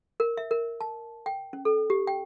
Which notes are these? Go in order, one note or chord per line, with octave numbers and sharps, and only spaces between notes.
A#4
E5
A#4
A5
G5
C#4
A4
G4
G5